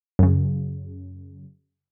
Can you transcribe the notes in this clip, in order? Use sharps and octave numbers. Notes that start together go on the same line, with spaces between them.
F#2 C#3